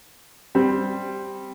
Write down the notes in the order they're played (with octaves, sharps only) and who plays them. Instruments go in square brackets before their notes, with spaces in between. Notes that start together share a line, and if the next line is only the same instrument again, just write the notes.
[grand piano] G3 C4